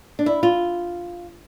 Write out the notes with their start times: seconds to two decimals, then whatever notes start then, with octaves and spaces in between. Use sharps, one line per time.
0.19 D4
0.26 E4
0.43 F4